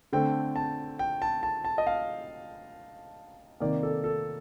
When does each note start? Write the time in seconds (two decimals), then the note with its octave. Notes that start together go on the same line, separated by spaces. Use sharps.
0.13 D3 A3 C4 G5
0.56 A5
0.99 G5
1.22 A5
1.43 A5
1.65 A5
1.78 D#5
1.87 F5
3.60 C3 D#3 A#3 D5
3.83 A4
4.04 A4